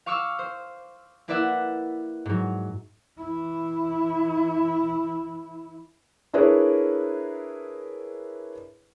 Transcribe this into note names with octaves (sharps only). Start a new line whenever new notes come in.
F5 C#6 D6 E6 F6
C5
A#3 E4 B4 D5 E5 F#5
G#2 F#3
E3 E4
D4 E4 G#4 A#4 B4 C#5